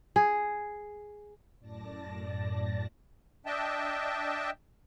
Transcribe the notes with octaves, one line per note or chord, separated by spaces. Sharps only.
G#4
F#2 A2 D5 A5 A#6
D4 D#5 E5 G5 A5